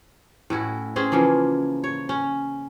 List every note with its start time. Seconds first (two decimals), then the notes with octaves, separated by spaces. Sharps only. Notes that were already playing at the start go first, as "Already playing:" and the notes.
0.50 A2 C#4 E4 F#4
0.96 C4 C#4 G#4 C5
1.12 C#3 E3 F3 A#3
1.84 C#5
2.09 C#4